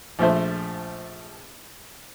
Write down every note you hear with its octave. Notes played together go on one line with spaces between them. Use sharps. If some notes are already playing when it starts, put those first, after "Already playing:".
A#1 F3 A3 C5